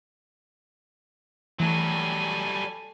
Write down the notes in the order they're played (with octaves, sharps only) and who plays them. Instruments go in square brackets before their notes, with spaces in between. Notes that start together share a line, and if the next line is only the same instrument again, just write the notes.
[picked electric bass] E3 A3 [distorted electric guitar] F#3 G3 [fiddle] A4 G#5